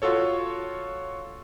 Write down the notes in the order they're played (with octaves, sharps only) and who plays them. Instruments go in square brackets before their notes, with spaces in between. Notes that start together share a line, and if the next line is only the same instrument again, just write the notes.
[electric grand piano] F4 F#4 A4 C#5